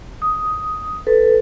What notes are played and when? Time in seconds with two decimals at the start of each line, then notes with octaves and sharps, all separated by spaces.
0.22 D#6
1.07 A4 B4